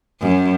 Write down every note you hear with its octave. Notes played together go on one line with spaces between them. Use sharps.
F#2